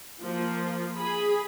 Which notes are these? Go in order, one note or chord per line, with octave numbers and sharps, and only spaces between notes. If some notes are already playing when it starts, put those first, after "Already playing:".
F3 A#3
G#4 B5